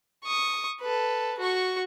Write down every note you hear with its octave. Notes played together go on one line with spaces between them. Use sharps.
C#6 D#6
A4 B4
F#4 C#6